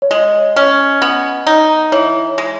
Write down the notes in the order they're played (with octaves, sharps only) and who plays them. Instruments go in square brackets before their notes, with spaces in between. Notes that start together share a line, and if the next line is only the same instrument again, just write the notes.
[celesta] C#5
[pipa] G#3 [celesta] D#5
[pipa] C#4
B3
D#4
[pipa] E3 [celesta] C#5
[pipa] G#3